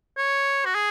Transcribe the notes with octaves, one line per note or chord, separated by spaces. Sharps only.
C#5
F#4
G#4